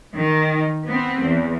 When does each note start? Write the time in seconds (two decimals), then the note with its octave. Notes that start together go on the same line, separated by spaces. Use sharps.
0.16 D#3
0.86 B3 C4
1.23 E2